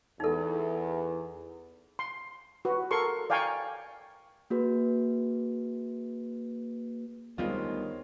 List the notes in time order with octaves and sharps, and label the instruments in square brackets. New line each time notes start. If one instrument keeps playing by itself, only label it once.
[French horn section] E2 [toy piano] D#4 A4
[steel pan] C6
F#4 B4
A4 A#4 C6 C#6
D5 F5 G5 G#5 A#5 C#6
[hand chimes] A#3 F#4 G#4 B4
[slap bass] D2 G3 B3 [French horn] D#3 [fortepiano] G#3 F4 [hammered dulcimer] C5 C#5